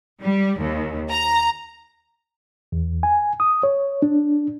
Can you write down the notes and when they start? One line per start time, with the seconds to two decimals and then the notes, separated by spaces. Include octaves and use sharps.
0.21 G3
0.60 D#2
1.11 A#5
2.72 E2
3.03 G#5
3.40 D#6
3.63 C#5
4.02 D4